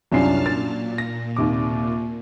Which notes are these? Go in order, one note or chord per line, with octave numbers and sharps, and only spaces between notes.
C2 F#2 F#3 D4 F4 A5 F6 C7
A#2 A6
A#6
D#2 C3 D6